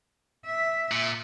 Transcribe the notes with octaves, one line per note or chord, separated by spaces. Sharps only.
E5
A#2